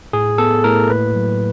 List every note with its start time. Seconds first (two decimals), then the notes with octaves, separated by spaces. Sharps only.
0.13 A2 G#4
0.38 B3 A4
0.64 A2 A#4
0.90 A#3 B4
1.15 F#3